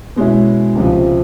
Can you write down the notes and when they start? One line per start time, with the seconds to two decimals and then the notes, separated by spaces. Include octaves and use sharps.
0.16 B2 G#3 C#4 E4
0.75 C#2 C3 F3